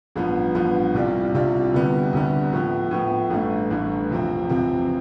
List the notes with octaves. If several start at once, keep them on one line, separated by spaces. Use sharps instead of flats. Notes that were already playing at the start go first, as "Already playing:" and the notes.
A1 G2 F3 B3
A1 G2 F3 B3
C2 C3 G3 D4 F4
C2 C3 G3 D4 F4
D2 C3 G3 B3
D2 C3 G3 B3
A2 F3 B3
A2 F3 B3
A1 G2 E3 A3
A1 G2 E3 A3
E2 C3 F3 C4
E2 C3 F3 C4